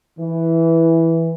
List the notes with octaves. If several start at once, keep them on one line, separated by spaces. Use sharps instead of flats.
E3